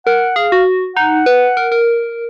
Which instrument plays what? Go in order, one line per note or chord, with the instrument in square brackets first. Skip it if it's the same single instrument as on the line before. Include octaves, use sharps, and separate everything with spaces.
[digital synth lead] A#4 [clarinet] F#5
[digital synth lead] G#4 [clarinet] F5
[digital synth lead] F#4
[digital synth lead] D#4 [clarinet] F#5
[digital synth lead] B4
A#4
A#4